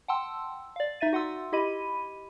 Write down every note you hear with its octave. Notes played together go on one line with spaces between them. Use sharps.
F#5 G5 A5 C6 E6
D5 F5
D#4 E5 A6 D#7
F#4 F#5 C6 E6
E4 G4 D#5 B5 D#7